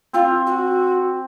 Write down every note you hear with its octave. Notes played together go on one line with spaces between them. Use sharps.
C4 F4
F#4